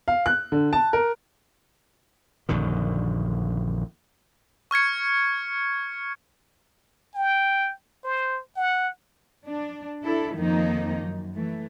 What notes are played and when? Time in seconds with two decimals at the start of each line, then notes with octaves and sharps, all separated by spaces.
0.08 F5
0.26 F#6
0.52 D3
0.73 A5
0.93 A#4
2.49 A#1 F#2 D3 D#3
4.71 C#6 F6 G#6 C#7
7.15 G5
8.04 C5
8.56 F#5
9.46 D4
10.03 D4 E4 A4
10.34 F2 D#3 F3 A#3 D#4
11.03 F#2
11.35 E3 A3